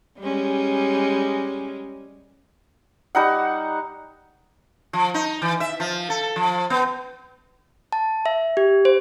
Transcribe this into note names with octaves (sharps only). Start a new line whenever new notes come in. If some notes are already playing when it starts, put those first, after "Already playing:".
G3 G#3 C#4
G3 D#4 F#5
F3
D#4
E3
E5
F3
A4
F3
B3
A5
E5
G4
C5